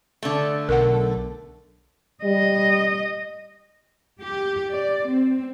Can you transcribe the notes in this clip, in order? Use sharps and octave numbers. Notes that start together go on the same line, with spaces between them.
D3 A3
B1 A#4 F#5
G3 D#5
G4
D5
C4